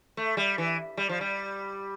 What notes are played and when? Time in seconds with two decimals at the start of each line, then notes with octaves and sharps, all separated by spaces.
0.17 A3
0.37 G3
0.58 E3
0.97 G3
1.09 F3
1.21 G3